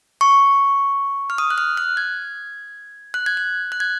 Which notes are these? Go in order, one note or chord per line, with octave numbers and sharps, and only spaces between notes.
C#6
F6
D#6
F#6
F6
F#6
G#6
F#6
G#6
F#6
F#6
G#6